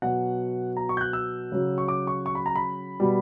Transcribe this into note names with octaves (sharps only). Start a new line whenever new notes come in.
B2 F#3 F#5
A#5
C#6
G6
F#6
E6
C#3 F#3
C#6
D6
C#6
C#6
B5
A#5
B5
B2 G3